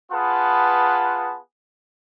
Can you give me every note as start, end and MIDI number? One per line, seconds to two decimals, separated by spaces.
0.12 1.38 59
0.12 1.38 65
0.12 1.38 68
0.12 1.38 71
0.12 1.38 78
0.12 1.38 81